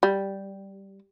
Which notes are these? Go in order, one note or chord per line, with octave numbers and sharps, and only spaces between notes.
G3